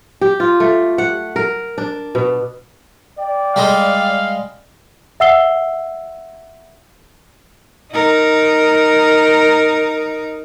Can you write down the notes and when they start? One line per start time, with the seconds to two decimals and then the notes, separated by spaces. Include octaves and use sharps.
0.21 G4
0.40 F4
0.60 A3
0.98 F#5
1.36 A#4
1.78 D4
2.15 B2
3.18 D5 G5
3.56 G3 G#3 F5
5.20 E5 F#5 E6 C7 G7
7.92 D#4 A#4